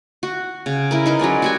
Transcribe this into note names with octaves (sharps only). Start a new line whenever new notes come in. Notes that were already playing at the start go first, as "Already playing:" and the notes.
F#4
C#3
E4 A#4
D#4 A#4 B4
F#3 G#3 C#4 D5
F#4 G4 G#5